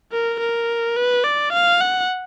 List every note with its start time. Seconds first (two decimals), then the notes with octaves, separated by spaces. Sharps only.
0.12 A#4
0.40 A#4
0.97 B4
1.24 D5
1.53 F5
1.81 F#5